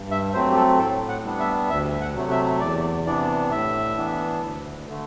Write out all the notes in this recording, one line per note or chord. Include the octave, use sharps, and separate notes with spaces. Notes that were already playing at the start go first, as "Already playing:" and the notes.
Already playing: G2
E5
F#3 A3 C4 C5
G4
A4
A2 A4
F#5
G3 B3 D4
E5
D2 E5
F#5
C3 F#3 A3
E5
E2 D5
C3 E3 B3 D4 D5
A2 E5
E3 B3 D4
D2
D3 A3